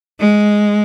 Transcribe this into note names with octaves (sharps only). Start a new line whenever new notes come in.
G#3